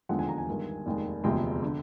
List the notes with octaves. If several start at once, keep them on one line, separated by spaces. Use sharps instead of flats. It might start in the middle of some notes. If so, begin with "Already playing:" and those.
E1 D#2 D3 F3 G#3 F#5
G#5
A#5
G#5
G1 G2 D#3 G#3
F1 D#2 D#3 G#3
E1 D2 C3 F3 G#3 G5
D3